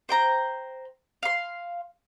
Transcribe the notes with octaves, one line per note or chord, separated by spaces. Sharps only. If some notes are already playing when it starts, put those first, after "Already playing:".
C5 G5 A#5
F5 C6